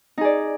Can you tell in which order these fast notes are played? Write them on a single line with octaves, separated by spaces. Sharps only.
D#4 G#4 D5